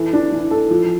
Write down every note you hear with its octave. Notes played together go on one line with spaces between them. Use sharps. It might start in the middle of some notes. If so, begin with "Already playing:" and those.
Already playing: E3 A4
D4
E3
A4
F3